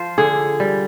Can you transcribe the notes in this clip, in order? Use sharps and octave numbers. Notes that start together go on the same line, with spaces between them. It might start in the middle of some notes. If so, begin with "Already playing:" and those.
Already playing: F3 F4 C5
D3 G#4
G3